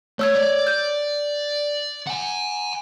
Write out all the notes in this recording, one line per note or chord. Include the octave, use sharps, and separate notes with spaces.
A3 C#5 E6 G#6
D5
G6
F#5 G#5